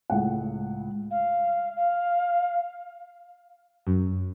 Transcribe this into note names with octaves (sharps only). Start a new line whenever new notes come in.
C#2 A2 F#5
F5
F5
F#2